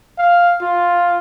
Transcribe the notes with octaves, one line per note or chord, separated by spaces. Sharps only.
F5
F4